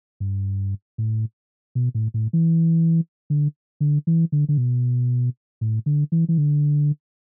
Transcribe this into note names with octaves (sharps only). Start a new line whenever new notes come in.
G2
A2
B2
A2
A2
E3
D3
D3
E3
D3
D3
B2
A2
D3
E3
E3
D3